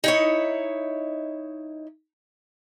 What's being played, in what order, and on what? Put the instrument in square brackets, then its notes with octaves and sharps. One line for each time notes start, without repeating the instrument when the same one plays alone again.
[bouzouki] D#4 E4 C#5